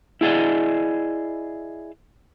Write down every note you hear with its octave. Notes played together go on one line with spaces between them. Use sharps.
E4 G#4 D5 D#5